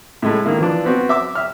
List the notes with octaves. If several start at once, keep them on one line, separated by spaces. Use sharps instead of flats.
A2 G#3 A3
D#3 A#3 E4
E3 F3 D4
B3 C4 F#4
E5 D6 E6
E5 F6